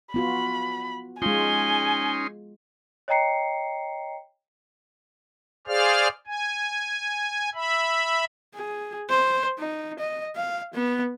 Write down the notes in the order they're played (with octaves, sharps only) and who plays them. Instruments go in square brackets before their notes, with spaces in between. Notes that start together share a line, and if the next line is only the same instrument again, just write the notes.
[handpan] B3 F4 F#4 [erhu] B5
[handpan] G#3 F4 [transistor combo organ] C#4 D#4 C6 [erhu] G#5 [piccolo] G7
[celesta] C#5 D#5 G5 A#5 C7 C#7
[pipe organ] G#4 C5 D5 F5 F6
G#5
E5 B5
[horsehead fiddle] G#4
C5
D#4
D#5
F5
B3